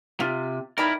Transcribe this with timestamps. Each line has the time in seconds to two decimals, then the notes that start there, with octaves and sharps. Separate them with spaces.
0.20 C3 F4
0.78 D#3 E4 A#4 D5 B5